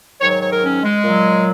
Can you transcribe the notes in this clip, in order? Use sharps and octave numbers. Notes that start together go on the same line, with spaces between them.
G#2 D#3 F#3 C#5
C#5
C#5
A#4
C#4
G#3
A#2 F#3